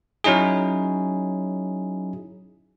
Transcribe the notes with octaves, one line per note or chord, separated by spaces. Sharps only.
F#3 C#4 D#4 E4 G#4